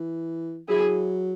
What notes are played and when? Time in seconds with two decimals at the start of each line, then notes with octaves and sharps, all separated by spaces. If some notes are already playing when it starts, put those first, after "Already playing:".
Already playing: E3
0.68 F#3 E4 G#4